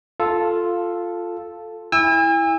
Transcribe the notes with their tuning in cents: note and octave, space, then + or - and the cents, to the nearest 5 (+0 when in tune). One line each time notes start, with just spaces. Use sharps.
F4 +0 A4 +0
E4 +0 G#5 -40 E6 +0